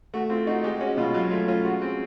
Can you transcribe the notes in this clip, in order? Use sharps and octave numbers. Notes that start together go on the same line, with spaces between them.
A3 F#4
C4 F4
D#4 F#4
G#3 G4
C#4 F#4
B2 F4
F#3 F4
A3 F4
C#4 F4
G#3 F#4
C4